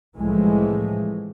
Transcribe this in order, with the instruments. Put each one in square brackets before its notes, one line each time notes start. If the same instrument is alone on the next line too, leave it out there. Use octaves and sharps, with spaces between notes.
[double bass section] C2 A2 E3 F3 G#3 A3